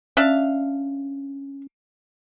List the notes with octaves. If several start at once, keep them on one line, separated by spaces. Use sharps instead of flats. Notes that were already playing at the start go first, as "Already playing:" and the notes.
C#4 D4 E5 F5